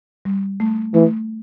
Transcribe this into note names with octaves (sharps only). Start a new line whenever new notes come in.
G3
A3
E3 A3